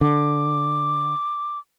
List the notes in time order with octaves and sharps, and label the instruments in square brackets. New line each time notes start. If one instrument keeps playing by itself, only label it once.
[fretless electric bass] D3 [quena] D6